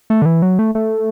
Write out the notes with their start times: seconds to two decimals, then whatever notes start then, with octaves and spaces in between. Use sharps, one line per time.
0.10 A3
0.22 D3
0.26 E3
0.42 F#3
0.59 A3
0.75 A3